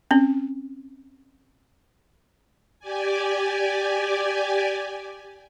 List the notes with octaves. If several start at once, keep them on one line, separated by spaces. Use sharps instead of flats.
C4 C#4
G4 D5 G#5